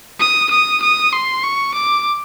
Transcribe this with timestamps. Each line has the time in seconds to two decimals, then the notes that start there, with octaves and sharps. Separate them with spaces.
0.20 D#6
0.51 D#6
0.82 D#6
1.13 C6
1.43 C#6
1.74 D6